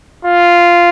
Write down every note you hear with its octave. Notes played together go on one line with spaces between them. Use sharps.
F4